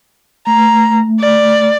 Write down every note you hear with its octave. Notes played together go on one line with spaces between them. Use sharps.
A3 A#5
D5